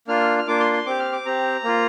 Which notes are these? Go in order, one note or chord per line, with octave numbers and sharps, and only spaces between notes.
A#3 D4 F4 F6
F6
A#3 D4 F4 D6
C6
C6
C4 G4 D6
F6
D6
C4 G4 A#5
A#3 F4